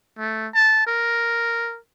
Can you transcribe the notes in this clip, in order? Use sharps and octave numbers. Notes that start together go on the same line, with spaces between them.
A3
A5
A#4